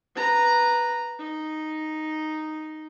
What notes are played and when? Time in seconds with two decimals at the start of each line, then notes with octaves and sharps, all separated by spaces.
0.15 B4 A#5
1.19 D#4